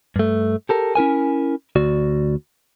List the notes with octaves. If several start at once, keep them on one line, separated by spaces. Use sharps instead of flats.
G2 A3
G4 A4 A#4
C#4 E4 A#4 G#5
D2 F#4 D5